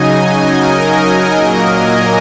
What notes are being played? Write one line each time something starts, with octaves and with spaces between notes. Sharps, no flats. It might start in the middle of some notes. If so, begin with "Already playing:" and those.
Already playing: C#3 F#3 D#4 D#5 G#5
D#5 G#5
A#4 D#5
A#2 F#3 A#3 A#4 D#5
D#5 G#5